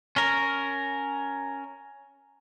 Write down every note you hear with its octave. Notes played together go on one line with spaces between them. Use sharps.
C#4 A#4